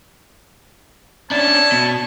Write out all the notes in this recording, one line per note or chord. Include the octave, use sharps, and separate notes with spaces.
C#4 D4 C#5 E5 A5
B2